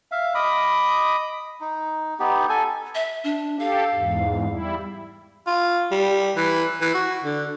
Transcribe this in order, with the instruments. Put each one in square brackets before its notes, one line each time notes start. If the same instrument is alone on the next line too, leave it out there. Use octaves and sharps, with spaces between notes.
[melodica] E5 F5
D#5 B5 D6 D#6
D#4
B3 D#4 G4
A4 G#5
[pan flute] E5
D4
[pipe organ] G4 A4 [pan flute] F5
[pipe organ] E2 G#2
G3 E4
[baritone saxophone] F4
G3
E3
E3
F#4
D3